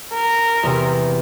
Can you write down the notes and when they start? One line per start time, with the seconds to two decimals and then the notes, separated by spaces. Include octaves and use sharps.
0.14 A#4
0.63 E2 C3